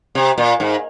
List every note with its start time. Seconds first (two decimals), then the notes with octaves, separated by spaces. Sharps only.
0.15 C3
0.38 A#2
0.60 G#2